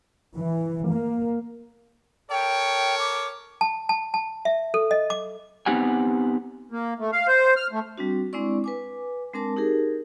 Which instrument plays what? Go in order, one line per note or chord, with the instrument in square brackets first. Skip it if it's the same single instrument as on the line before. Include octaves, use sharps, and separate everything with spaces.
[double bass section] E3
A#3
[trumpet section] A4 A#4 C#5 [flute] G5
[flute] D6
[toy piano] A5
A5
A5
E5
A4
D#5
D6
[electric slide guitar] B3 C4 D#4 G4 F#5 G#5
[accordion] A#3
A3
F5
C5
F6
A3
[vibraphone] G3 C4 D4 F#4
G#3 C4 D4 E4 D5 C#6
B4 G#5 D6
G#3 C4 D4 A#4 A5 D6
D#4 G4 G#4 A#4